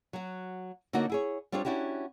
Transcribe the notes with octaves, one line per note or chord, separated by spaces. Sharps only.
F#3 F#4
D3 A#3 D#4 F#4 C#5
E4 G#4 C#5
G3 C4 D4 F4 G4 C#5
C#4 D4 E4 F#4 G4